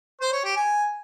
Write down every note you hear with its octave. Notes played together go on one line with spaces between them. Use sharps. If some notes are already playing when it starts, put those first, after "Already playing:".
C5
C#5
G4
G#5